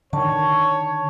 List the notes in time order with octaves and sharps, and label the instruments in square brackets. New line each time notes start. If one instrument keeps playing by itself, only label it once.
[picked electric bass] D3 D#3 [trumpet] C#5 [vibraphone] A5 C#6